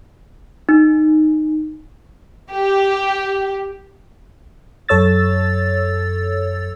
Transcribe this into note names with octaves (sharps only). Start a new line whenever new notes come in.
D#4
G4
F#2 A4 C#5 E6 A6